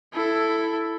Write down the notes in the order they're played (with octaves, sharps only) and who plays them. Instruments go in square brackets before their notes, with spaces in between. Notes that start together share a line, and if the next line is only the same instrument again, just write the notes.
[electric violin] E4 A4